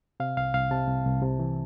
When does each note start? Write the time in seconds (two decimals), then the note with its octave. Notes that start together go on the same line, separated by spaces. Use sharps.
0.20 C3 F5
0.37 C2 F5
0.54 C2 F5
0.71 C3 A5
0.88 C2
1.05 C2
1.22 C3
1.39 E3